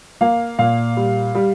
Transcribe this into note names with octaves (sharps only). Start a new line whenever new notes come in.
A#3 F5
A#2 F5
G3
G3